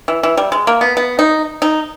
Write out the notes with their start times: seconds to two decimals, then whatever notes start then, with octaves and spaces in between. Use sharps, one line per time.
0.08 E3
0.23 E3
0.37 G3
0.52 G#3
0.67 A#3
0.81 B3
0.97 B3
1.19 D#4
1.62 D#4